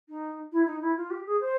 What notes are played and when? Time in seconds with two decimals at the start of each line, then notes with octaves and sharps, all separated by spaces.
0.09 D#4
0.52 E4
0.66 D#4
0.81 E4
0.97 F4
1.10 G4
1.26 G#4
1.40 C5